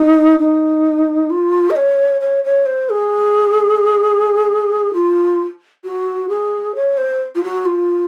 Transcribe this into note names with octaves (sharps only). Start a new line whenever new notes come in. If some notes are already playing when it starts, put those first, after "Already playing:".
Already playing: D#4
D#4
F4
D#5
C#5
C#5
C#5
C5
G#4
F4
F#4
G#4
C#5
C5
F4
F#4
F4